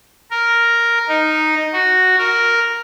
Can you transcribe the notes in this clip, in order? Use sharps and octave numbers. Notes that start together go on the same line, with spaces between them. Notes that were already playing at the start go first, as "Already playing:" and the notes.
A#4
D#4
F#4
A#4